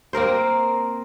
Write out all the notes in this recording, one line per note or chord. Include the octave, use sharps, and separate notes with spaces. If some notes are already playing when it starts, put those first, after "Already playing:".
A#3 C4 A#4 C5